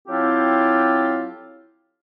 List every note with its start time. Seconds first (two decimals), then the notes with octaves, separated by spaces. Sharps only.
0.08 F#3 C4 E4 F4 G4 A4